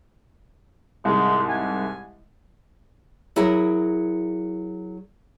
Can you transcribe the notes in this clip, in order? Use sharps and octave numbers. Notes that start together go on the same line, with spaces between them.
C2 G#2 G#3
G#5
F#3 E4 G#4 A#4